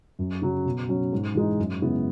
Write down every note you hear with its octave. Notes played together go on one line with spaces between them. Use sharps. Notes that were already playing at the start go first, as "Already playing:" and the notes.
F#2
C#3 F#3
B2
F#3 C#4
G#2
E3 G#3 D#4
F#2
C#3 G#3 B3 E4